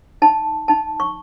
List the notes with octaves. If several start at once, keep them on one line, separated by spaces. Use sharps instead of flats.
D#4 A5
D#4 A5
C#6